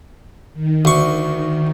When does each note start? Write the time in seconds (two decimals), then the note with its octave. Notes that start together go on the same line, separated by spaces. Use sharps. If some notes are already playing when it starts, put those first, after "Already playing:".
0.53 D#3
0.85 D2 C#6